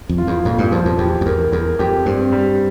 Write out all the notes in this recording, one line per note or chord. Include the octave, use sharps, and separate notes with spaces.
F2
F4
E2
F2 A#2
G2
E2 F3
F2
E2 G4
F2
E2 A#4
E2 A#4
F2 G4
G2 C4
G3